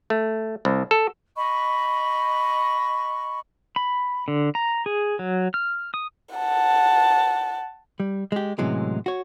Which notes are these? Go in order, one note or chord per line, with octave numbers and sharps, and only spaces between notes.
A3
C2
A4
D#5 B5 C#6
B5
D3
A#5
G#4
F#3
F6
D#6
F#5 A5
G3
G#3 G4
A2 C3 E3 F#3 G#3 C#4
F#4 C#5